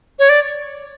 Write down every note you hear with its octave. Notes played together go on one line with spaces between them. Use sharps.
C#5
D5